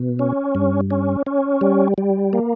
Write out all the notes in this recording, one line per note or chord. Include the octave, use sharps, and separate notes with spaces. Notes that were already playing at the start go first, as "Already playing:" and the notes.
Already playing: B2
C#4
G2
C#4
C#4
G3
G3
A#3